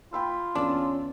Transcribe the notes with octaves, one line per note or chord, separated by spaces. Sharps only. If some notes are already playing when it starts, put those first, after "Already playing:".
F4 G5 B5 E6
E2 C#4 D4 A4